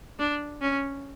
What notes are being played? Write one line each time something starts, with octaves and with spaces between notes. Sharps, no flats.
D4
C#4